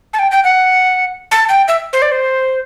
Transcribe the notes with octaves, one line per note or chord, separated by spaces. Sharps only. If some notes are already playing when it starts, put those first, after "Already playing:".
A5
G5
G5
F#5
A5
G5
E5
C5
D5
C5